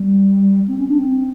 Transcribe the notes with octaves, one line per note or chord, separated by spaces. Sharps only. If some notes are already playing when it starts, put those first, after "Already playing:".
Already playing: G3
C4
C#4
D4
C4